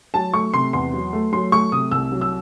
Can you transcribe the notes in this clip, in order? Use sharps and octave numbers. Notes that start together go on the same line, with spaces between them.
F#3 A5
A3 C#6
C3 C6
E2 C6
F#3
A3
F#3 C6
A3 C#6
C3 D#6
C2 E6
F#3
E6